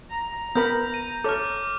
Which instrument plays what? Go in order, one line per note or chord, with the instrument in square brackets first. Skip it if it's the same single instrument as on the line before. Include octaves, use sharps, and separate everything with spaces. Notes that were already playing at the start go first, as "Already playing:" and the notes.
[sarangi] A#5
[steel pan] B3 A#4 B5 [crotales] G6
[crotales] D#7
[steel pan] A4 C#5 [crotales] D6 F6